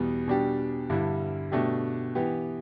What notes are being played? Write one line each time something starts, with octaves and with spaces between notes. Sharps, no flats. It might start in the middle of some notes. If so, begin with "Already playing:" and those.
Already playing: E2 B2 G3 B3
B2 G3 D4 G4
G2 D3 G3 E4
B2 A3 D4 G4
E3 B3 G4